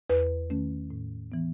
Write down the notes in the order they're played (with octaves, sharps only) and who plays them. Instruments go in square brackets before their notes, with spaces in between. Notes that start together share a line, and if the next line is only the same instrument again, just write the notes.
[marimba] E2 B4
D#3 A3 C#4
A2
E3 B3